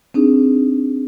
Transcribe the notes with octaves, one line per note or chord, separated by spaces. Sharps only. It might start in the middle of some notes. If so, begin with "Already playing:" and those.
C4 D4 D#4 G#4